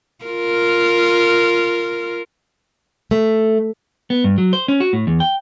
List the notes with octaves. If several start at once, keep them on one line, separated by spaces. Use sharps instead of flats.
F4 A#4
A3
B3
G2
F#3
C5
C#4
F#4
A2
E2
G5